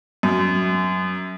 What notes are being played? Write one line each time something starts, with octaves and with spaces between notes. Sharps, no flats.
F#2